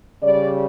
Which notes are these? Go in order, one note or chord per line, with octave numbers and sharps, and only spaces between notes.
C#3 G3 D5